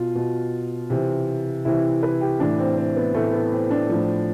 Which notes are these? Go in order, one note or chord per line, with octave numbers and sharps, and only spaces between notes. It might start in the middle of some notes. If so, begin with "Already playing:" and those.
Already playing: B2 F4
B2
C3 E3
C3 E3 E4
B4
G4
A2 E3 D4
C4
C4
B3
A2 E3 A3
B3
C4
D4
A2 F3